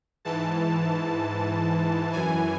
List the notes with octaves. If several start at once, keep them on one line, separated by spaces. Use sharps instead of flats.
G#2 E3 A5
F#2 E3 G#5